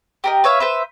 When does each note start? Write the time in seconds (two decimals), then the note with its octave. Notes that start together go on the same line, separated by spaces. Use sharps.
0.24 G4 A#4 D#5
0.44 B4 C#5 E5 F5
0.60 B4 C5 E5